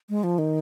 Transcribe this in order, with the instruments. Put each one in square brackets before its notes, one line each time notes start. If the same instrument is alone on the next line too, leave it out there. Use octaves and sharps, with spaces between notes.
[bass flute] G#3
F3
D#3